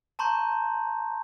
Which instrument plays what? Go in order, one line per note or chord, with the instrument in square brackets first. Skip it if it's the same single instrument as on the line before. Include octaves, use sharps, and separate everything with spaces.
[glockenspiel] A5 A#5 C6 C#6 G6